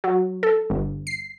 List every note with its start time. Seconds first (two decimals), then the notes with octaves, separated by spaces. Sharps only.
0.04 F#3
0.43 A4
0.70 G1
1.07 C7